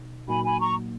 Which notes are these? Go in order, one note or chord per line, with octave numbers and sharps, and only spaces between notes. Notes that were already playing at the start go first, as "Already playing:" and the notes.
Already playing: B2 D#4
A#2 F#3 A#3 D#4 F#4 G#5 B5
G#5 B5
A#5 C#6